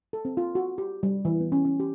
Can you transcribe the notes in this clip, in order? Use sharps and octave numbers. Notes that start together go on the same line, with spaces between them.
A4
C4
F4
F#4
G4
G3
E3
B3
C#4
C#4
G4